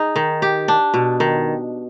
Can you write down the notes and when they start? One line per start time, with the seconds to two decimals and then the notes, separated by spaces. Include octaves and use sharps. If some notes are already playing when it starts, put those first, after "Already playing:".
Already playing: D#4 G#4
0.16 D#3
0.42 G4
0.68 D4
0.94 B2
1.20 D#3